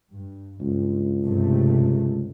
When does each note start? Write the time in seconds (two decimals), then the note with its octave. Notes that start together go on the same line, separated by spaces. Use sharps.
0.12 G2
0.61 C#2 G2
1.24 G2 C3 A3